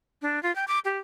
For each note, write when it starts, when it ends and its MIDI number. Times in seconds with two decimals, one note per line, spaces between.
0.22 0.42 62
0.43 0.54 65
0.55 0.65 79
0.68 0.79 86
0.85 0.98 67